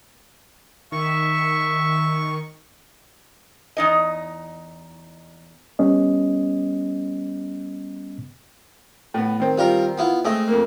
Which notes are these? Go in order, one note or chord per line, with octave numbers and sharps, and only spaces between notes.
D#3 E5 C#6
E2 D#4 D#5
G3 B3 C#4 D#5
A2 B3
D#3 C4
G3 F4 A#4
B3 E4 F4
G#3 A3 C4 D#5
F2 A#3